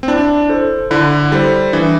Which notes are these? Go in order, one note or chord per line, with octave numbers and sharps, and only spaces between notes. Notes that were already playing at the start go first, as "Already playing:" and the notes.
C4
D4 E4
A4 C5
D3 E4
G3 A4 C5
E3 D4